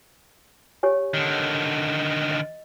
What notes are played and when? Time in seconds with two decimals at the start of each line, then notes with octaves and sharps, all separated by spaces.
0.83 G4 C#5 G#5
1.14 D3 D#3
2.31 D#5